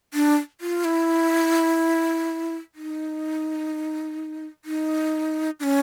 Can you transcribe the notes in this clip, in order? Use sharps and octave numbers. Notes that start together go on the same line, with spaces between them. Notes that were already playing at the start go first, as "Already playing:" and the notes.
D4
F4
E4
D#4
D#4
D4
C#4